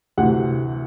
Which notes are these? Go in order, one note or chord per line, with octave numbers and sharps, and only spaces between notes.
D2 C3 E3 F#5